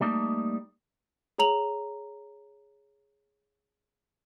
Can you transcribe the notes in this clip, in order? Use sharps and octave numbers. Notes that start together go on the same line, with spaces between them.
G3 A3 A#3 D#4
G#4 C#5 A#5 F7 F#7